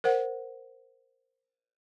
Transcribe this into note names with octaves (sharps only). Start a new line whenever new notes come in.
A#4 C5 F#5